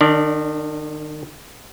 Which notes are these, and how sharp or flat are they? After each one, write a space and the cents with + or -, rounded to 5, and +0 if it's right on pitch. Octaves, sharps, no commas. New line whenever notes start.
D#3 -35 D4 +5 D5 -15